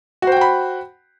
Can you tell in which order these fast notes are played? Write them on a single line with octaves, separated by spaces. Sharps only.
F#4 C5 G5 F#5 B5